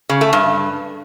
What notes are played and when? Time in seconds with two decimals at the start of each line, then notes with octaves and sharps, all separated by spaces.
0.09 C#3
0.21 A3
0.33 G2